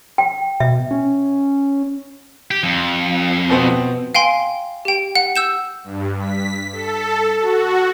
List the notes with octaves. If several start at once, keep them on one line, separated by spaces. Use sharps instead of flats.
G5
B2 E5
C#4
G4
F2
B2 B3 C4
F5 G5 G#5 C6
G4 G5
F#5
E6 G6 E7
G2
B6
A4
F#4